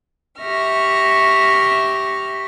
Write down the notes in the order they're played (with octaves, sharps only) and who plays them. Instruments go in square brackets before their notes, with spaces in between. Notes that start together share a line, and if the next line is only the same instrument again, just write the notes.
[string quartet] G4 E5 C#6 F6 A#6